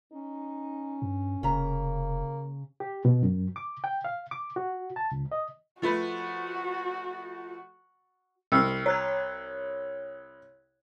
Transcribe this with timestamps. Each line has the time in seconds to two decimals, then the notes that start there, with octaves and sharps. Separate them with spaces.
0.13 C#4 D#4
1.02 G2
1.43 F1 C#3 A#3 A#5
2.80 G4
3.05 B2
3.23 F#2
3.56 D6
3.84 G5
4.05 F5
4.31 D6
4.56 F#4
4.96 A5
5.11 C#2
5.32 D#5
5.82 F3 A3 F#4 B4
8.52 C2 E6 F6 C7
8.86 C#5 F#6 G#6